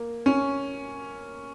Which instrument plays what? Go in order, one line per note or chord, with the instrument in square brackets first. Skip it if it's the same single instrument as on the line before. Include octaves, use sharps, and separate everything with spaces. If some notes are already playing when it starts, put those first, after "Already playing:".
Already playing: [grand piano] A#3
C#4